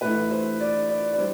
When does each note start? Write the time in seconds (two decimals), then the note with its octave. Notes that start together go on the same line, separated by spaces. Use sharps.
0.01 A2 E3 A3 B4
0.31 C5
0.60 D5
0.89 D5
1.13 D5
1.18 G3 C5